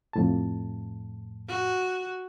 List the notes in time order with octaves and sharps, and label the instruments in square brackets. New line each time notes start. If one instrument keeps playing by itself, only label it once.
[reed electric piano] F2 A2 A5
[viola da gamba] F#4